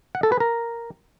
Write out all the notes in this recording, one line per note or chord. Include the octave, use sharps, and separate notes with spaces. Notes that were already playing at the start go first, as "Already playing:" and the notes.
F#5
A4
B4
A#4